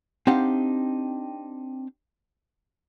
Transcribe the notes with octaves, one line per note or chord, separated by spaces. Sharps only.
C4 D4 D#4 G4 F5 F#5